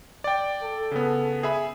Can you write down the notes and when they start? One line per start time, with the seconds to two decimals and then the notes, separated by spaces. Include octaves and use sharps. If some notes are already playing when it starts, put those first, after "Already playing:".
0.24 D5 G5
0.63 A4
0.91 C#3 B3
1.43 G#4 E5 B5